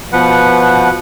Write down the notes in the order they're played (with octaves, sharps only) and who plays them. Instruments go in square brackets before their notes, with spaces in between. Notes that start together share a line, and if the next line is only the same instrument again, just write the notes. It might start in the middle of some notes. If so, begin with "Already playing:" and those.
[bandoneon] B2 F3 B4 F#5